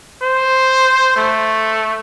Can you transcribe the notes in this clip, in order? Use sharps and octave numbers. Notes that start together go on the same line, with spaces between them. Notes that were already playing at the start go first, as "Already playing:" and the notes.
C5
A3